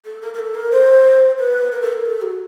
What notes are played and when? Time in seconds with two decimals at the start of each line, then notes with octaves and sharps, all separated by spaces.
0.05 A4
0.22 A#4
0.34 A#4
0.39 A4
0.55 A#4
0.72 C5
1.38 B4
1.72 A#4
1.82 A4
1.92 A#4
2.06 A4
2.22 F#4